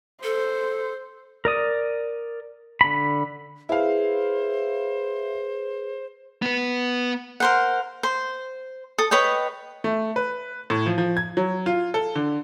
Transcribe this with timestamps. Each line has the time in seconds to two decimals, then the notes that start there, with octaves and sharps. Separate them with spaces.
0.23 A4 C5
1.45 A#4 D5 D#6
2.81 D3 B5
3.69 E4 G#4 B4 C5 F5
6.42 B3 B4
7.40 A#4 C5 F#5
8.03 C5
8.98 A4 D#6
9.11 B4 C#5 D#5 G5
9.84 A3
10.16 B4
10.70 A2
10.86 F3
10.98 F3
11.17 G#6
11.37 F#3
11.66 F4
11.94 A4
12.15 D3